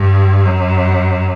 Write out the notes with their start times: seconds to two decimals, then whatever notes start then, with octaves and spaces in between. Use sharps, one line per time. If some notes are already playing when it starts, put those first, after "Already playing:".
Already playing: G2
0.45 F#2